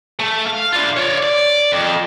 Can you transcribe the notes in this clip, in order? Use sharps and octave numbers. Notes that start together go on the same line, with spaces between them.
A3
F5
D4 F4
C#5 D5
D5
F2